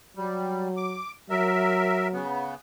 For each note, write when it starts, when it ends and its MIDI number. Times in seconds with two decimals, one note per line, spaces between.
0.17 1.00 54
0.17 0.68 55
0.77 1.11 86
1.30 2.21 54
1.30 2.08 70
1.30 2.08 76
2.13 2.55 49
2.13 2.55 59